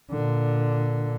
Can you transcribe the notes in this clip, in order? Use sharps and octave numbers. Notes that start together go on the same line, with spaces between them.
A#2 D3